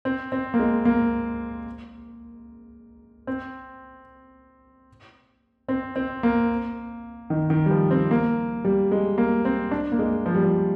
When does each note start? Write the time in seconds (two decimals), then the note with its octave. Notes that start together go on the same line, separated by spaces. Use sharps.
0.05 C4
0.32 C4
0.54 A#3
0.59 G#3
0.85 A#3
3.27 C4
5.68 C4
5.96 C4
6.23 A#3
7.30 D#3
7.50 D#3
7.66 G3
7.71 F3
7.91 C4
8.11 A#3
8.65 G3
8.92 G#3
9.18 A#3
9.45 C4
9.71 D4
9.92 A#3
9.99 G#3
10.26 F3
10.34 G3
10.44 F3